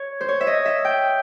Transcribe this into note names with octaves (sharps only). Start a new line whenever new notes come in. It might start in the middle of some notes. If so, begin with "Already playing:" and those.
Already playing: C#5
C5
C#5
E5
D#5
E5
G5